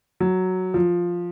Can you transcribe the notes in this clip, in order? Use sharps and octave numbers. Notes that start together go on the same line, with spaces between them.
F#3
F3